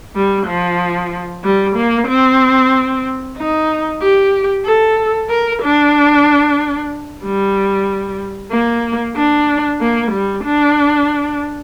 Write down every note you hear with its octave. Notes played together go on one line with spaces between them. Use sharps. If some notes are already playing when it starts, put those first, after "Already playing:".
G3
F3
G3
A#3
C4
D#4
G4
A4
A#4
D4
G3
A#3
D4
A#3
G3
D4